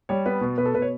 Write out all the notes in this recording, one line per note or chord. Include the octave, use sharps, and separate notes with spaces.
G3 C#5
B3 B4
B2
B2 B4
A4
B2 B4
C#5